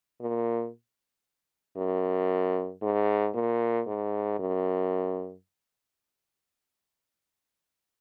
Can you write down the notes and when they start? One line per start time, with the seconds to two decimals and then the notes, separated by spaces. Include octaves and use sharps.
0.21 A#2
1.77 F#2
2.82 G#2
3.34 A#2
3.87 G#2
4.39 F#2